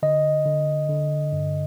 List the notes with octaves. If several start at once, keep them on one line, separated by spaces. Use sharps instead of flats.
D3 D#5
D3
D3
G2